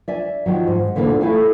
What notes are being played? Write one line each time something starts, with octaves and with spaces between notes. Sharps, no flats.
D5 E5 G#5
D#3 F3 F#3
G#2
D2 A#2 D3 E3 A#3
A3 E4 A4 F5 G#5